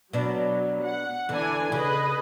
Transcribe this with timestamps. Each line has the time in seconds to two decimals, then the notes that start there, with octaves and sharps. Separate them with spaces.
0.13 B2 F#3 D4
0.83 F#5
1.29 E2 D3 E3 D4 G#5
1.72 C#3 G#4 B4 D#5